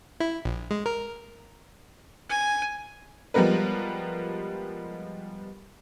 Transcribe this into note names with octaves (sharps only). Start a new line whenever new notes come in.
E4
A#1
G#3
A#4
G#5
F3 G3 G#3 B3 A#4 B4